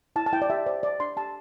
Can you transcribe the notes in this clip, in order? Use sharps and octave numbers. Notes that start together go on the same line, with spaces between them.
E4 A5
A5
E4 G5
D5
G4 E5
C5 D5
C5 D5
D4 C6
G4 A5